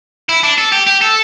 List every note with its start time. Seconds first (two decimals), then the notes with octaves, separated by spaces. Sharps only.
0.29 E4
0.43 D4
0.58 A4
0.72 G4
0.87 G4
1.01 A4